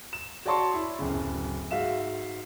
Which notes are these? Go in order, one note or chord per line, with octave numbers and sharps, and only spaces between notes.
E7
F#4 C#5 D5 A5 C6 C#6
E4
D1 F#2 C#3
G#2 F#4 E5 F5 E7